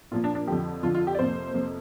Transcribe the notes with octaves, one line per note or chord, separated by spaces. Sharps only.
A#2 F3 A#3 F4
D4
D4
F2 D3 F3 G4
F2 D3 F3 F4
F4
G4
D5
F2 C3 A#3 C5
F2 C3 A#3